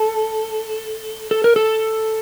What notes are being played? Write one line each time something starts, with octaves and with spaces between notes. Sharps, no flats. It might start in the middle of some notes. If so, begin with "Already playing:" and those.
Already playing: A4
A4
A#4
A4